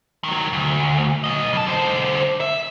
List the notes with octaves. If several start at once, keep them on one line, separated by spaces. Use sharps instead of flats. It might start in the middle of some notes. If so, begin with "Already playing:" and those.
D#3 F#3
D2
F#3 D#5
C#2 A5
D3 C5
E5